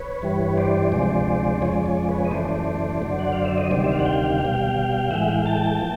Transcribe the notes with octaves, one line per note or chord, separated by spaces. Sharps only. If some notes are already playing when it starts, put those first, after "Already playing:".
Already playing: B4 C#5
G2 E3 G3
C5 D5
D2 C3 F3 G#3 C5 D5
F2 C#3 F3 G#3 C#5
D5
C#5
D5
B4 C#5
D#5
F#2 C#3 E3 A3 C5 D5
F#2 D3 F#3
F#5
F5
E5
D#5
D2 C3 D#3 G3 C5 D5
E5
F5
F#5
F5 G5
B2 G3
A2 E3 G#3 E5 F#5
F5 G5
G5 A5
A#2 F3